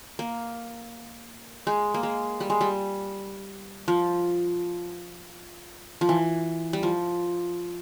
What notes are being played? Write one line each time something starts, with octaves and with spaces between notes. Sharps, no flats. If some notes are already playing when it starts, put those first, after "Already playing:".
A#3
G#3
A#3
G#3
G3
G#3
G3
F3
F3
E3
G3
F3